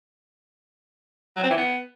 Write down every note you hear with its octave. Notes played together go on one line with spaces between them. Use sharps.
F#3
C4
E3
B3